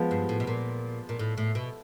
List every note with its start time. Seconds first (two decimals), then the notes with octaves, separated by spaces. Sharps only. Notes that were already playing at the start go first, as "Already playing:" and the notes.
Already playing: F3 G#3 B3
0.11 G2
0.29 A2
0.40 B2
0.47 A#2
1.09 A#2
1.19 A2
1.38 A2
1.55 B2